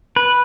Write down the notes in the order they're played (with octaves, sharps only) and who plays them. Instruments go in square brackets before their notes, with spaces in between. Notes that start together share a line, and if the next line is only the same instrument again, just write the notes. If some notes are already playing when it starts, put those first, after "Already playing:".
[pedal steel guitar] B4